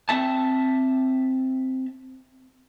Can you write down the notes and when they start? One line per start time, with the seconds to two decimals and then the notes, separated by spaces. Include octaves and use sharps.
0.09 C4 E5 A5